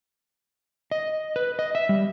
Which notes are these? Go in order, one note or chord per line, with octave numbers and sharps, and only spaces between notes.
D#5
B4
D#5
E5
G3